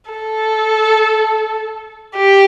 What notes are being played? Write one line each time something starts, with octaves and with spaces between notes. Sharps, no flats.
A4
G4